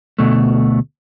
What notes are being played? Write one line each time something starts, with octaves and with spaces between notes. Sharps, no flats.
D2 B2 A3